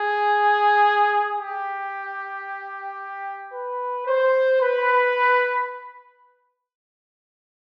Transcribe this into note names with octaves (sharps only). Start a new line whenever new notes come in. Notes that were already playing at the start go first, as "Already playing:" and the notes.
Already playing: G#4
G4
B4
C5
B4